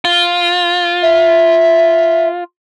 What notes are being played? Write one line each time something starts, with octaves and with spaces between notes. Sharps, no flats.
F4
E5